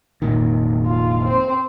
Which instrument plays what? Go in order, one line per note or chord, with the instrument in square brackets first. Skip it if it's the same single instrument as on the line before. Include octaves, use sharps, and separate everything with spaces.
[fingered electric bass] F1 A#2 D#3
[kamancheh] F4
C4 C5